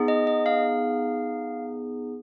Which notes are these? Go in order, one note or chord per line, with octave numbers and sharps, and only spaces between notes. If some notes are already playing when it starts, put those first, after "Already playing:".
Already playing: B3 D#4 G#4
D#5
D#5
F5